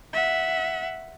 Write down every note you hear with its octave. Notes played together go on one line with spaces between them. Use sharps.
E5 F#5